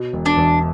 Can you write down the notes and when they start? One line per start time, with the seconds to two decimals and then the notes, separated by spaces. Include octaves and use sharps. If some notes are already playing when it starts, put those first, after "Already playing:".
Already playing: B2
0.13 E1
0.26 D4
0.37 E2